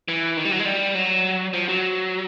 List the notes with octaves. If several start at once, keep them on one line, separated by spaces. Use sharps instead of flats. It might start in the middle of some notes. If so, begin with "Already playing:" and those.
E3
D#3
G3
F#3
G#3
G3
F#3
F3
F#3